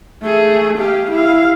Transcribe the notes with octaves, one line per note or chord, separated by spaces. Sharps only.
A3 G#4
G4 F5
E4 F5